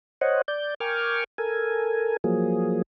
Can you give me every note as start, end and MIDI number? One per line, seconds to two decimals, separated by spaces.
0.21 0.42 72
0.21 0.42 73
0.21 0.42 75
0.21 0.42 78
0.48 0.74 74
0.48 0.74 91
0.80 1.24 70
0.80 1.24 79
0.80 1.24 80
0.80 1.24 85
0.80 1.24 86
0.80 1.24 89
1.38 2.17 69
1.38 2.17 70
1.38 2.17 80
2.24 2.82 53
2.24 2.82 54
2.24 2.82 58
2.24 2.82 68